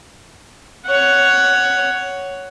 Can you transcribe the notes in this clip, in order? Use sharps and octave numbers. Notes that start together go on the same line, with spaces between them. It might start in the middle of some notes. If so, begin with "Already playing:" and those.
C#5 F#5